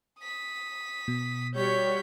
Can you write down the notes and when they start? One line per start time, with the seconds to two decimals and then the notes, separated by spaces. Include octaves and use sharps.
0.20 D#6 B6
1.08 B2
1.55 G3 F#4 C#5 G6 B6